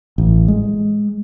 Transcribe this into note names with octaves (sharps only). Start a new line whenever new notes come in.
A1
G#3